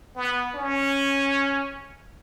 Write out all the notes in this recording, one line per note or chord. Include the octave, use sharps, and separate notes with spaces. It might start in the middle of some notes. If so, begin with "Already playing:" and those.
B3
C#4